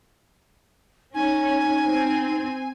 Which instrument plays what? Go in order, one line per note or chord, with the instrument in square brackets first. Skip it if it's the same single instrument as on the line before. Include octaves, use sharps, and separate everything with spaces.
[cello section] C#4 [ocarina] D#4 [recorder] G#5
[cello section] C4